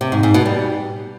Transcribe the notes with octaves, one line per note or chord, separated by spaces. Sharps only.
C3
G#2
G#2
B2
G3